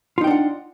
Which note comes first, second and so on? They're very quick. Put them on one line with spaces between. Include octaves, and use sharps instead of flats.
F4 D#4 G5 D4 F#5